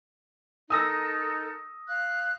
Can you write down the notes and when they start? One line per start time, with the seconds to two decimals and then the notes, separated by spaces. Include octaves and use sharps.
0.70 D#4 A4 A#4 D#6 E6 A#6
1.87 F5 F#6